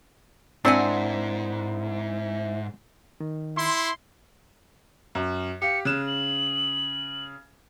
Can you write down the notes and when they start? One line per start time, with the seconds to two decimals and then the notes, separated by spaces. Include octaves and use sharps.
0.65 G#2 C4 D4 E4 A#4 C5 F#5 G#5
3.20 D#3
3.57 E4 C6
5.15 F#2
5.62 G4 F5 C#7
5.85 C#3 F#6 E7
6.07 F#7